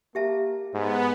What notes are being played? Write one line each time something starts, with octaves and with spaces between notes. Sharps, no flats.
A#3 G4 E5 A5
G#2 B3